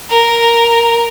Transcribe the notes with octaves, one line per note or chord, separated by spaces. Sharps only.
A#4